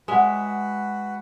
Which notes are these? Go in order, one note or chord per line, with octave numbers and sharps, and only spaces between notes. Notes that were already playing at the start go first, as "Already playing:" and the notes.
G#3 F#4 B4 C#5 E5 F#5